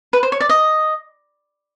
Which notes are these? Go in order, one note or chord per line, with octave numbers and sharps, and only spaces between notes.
B4
C5
C#5
D5
D#5